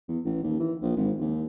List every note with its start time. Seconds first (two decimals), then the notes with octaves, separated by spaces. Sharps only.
0.08 E2
0.25 A1
0.43 D#2
0.59 E3
0.82 A#1
0.96 G#1
1.20 D#2